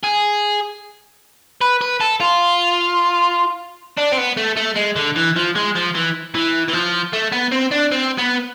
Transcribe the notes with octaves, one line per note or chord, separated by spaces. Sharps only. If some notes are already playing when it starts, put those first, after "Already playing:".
G#4
B4
B4
A4
F4
D4
C4
B3
A3
A3
G#3
D3
E3
F3
G#3
F3
E3
E3
E3
F3
A3
B3
C4
D4
C4
B3